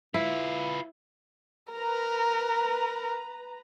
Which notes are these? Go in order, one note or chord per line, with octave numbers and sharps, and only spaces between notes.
E4 F4 B4
A#4 B4 A#5